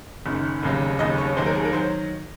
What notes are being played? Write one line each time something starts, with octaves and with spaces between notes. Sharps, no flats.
F#1 F#2 D#3
F1 D#2 C#3 F#3
F1 D#2 C#3 F#3 D#5
C#5
F1 D#2 D#3 F#3 C5
A#4
G#4
A#4
D#3 F#3 C5